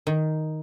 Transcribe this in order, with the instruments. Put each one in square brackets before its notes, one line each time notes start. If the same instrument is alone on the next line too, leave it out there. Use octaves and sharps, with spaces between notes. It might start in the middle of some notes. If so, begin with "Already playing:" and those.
[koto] D#3